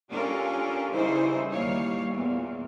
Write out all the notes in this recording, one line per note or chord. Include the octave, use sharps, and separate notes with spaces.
C#4 D4 F4 G4 A4 A#4
C#3 E3 G3 D#4 E4 C5
D#2 G3 C#5 F5
E2 A#2